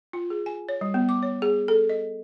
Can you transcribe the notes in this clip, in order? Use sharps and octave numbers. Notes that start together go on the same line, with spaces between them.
F4
G#4
G#5
C#5
G3
B3
D6
C#5
G#4
A4
D#5